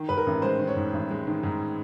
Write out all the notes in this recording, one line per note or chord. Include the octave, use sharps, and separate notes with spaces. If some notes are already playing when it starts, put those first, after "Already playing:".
Already playing: D#3
G#2 B4
A#4
A1
G#3 C5
D#3
C#5
G#2
A1
G#3
D#3
G#2